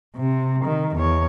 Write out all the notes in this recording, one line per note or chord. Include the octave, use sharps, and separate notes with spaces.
C3
D#3
E2 C#5